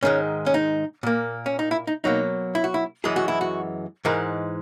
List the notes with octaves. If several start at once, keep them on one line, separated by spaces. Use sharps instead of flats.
G#2 D#3 G#3 C#4
C#4
D#4
A#2 A#3
C#4
D#4
E4
D#4
B2 F#3 A#3 D#4
E4
F#4
E4
F#2 E3 G#3 G#4
F#4
E4
F#4
G#2 E3 G#3 A#4